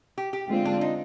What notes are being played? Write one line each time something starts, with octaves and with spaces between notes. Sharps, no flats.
G4
G4
D3 G#3 C4 F4
D4
D#4